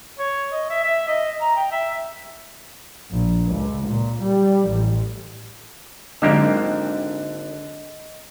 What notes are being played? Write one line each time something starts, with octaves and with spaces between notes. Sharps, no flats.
C#5
D#5
E5
E5
D#5
A#5
G5
E5
A#1
C#2
A#2
G3
A1
G#1 D3 F#3 G#3 A#3 E4 G4 D#5